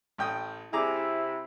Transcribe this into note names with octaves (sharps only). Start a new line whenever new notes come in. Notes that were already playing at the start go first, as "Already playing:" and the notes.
A1 G5 D#6
C3 E4 G#4 A#5 D6